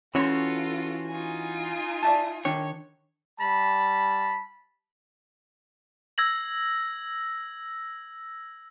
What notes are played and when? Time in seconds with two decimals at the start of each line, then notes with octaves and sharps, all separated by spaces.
0.15 E3 C#4 F4 F#4 A4 C#5 B5 C6
1.08 D#4 F4 G#5
2.03 D5 E5 A5
2.45 D#3 D4 C#5 G5
3.40 G3 A5 B5
6.18 E6 G#6 A#6 F#7